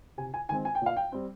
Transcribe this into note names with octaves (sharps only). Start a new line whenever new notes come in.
C3 G#5
G#5
D#3 G#3 C4 G#5
G#5
G5
A#2
F5
G5
G3 C4